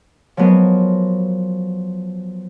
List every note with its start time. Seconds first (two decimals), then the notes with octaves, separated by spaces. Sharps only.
0.37 F3 F#3 G#3 B3 A#4